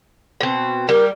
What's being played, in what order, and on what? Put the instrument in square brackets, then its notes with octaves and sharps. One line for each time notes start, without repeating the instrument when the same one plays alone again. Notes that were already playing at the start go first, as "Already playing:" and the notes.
[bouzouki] B2 C4
[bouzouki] G3 [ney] A#4